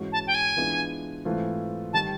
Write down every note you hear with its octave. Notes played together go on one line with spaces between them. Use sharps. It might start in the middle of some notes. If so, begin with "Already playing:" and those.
Already playing: G#2 E3 G#3 C#4 F#4
A5
G5
G#5
E3 G#3 B3 D4 F4
G#2 E3 A3 C4 F4
D#3 G3 A5